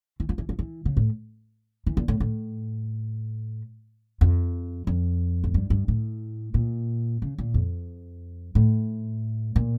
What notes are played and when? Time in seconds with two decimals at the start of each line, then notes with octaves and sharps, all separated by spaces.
0.20 E3
0.29 F3
0.38 E3
0.49 F3
0.59 E3
0.85 C#3
0.97 A2
1.86 E3
1.97 A#2
2.08 A2
2.20 A2
4.21 F2
4.87 F2
5.44 A2
5.54 G2
5.70 G2
5.88 A2
6.54 A#2
7.22 C#3
7.38 A#2
7.54 F2
8.55 A2
9.56 A#2